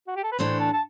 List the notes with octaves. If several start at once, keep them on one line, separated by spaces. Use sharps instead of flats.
F#4
G4
A4
B4
A2 E3 A3 D4 C5
A5
A5